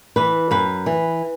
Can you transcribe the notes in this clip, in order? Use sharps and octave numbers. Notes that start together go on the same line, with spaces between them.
E3 B4
F#2 B4
E3